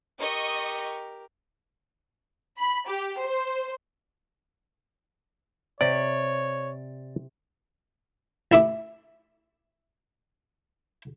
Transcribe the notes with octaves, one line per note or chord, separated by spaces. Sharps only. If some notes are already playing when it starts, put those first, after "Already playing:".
G4 A#4 D#5 C#6
B5
G4
C5
C3 C#5 D5
A1 E4 E5 D6